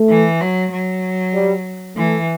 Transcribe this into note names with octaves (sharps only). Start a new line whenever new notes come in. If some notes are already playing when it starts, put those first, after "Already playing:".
Already playing: A3
E3
F#3
F#3
G3
E3 A3